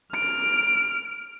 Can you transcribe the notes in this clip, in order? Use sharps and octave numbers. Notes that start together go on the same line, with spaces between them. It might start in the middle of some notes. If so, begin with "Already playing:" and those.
F6 D7